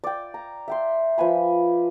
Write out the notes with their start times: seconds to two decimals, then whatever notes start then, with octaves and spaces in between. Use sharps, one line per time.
0.04 D5 G5
0.34 A#5
0.68 E5 G5 C6
1.18 F3 B4 G#5 B5